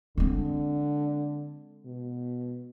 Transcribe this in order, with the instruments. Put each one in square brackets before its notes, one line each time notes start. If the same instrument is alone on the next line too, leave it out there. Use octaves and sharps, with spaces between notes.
[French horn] D3 [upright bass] G#3 C4
[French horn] B2